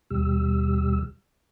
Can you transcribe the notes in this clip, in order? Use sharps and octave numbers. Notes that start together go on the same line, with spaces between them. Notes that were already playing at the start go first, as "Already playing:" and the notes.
D#2 B2 G3 G4 E6